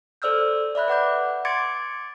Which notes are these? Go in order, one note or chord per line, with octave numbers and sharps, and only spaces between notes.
A4 C5 D5 E6 F6 G6
D5 E5 B5 F#6
B4 F#5 D6 G6
C6 D6 G#6 A6 C#7 D7